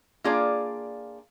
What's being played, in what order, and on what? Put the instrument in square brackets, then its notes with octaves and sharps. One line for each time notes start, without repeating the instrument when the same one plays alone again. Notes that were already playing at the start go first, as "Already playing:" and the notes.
[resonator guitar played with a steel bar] A#3 D4 F4 G#4 D5 F5